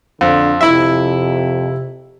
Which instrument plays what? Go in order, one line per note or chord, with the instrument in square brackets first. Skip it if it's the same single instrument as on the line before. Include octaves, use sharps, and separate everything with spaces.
[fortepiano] F2 [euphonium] D3
[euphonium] F2 [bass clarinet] C3 [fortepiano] E4 E5